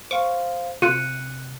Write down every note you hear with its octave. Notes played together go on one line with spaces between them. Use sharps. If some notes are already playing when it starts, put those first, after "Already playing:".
C5 F5 C#6
C3 F4 F#6 C#7 D#7